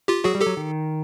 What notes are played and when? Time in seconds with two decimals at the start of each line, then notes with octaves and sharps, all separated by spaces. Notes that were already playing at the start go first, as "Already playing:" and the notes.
0.08 F4 G4
0.24 F#3 F#4 G#4
0.35 G3
0.40 G4 A4
0.46 F#3
0.57 D#3